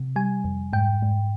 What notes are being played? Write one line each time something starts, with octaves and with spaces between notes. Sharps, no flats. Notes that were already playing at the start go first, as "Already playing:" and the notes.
Already playing: C3
G3 G#5
F2
G#2 G5
G#2